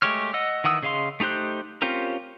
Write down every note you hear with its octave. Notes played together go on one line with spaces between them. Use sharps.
G#3 A3 G4 C#5 F6
D#5 F#5 E6
D#3 E3 F#5 D#6 E6
C#3 G#4 D#5 F5 C6
A3 D#4 G4 C5 F#6
C4 C#4 F4 G4 A#4